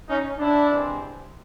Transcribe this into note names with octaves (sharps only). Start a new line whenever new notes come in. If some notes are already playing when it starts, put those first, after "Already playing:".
C#4 D#4
D4 E4
C3 E3 G#3 C4